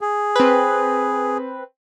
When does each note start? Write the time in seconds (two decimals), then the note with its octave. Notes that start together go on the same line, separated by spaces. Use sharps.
0.01 G#4
0.36 C4 B4